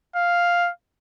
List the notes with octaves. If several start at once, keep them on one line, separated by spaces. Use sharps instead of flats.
F5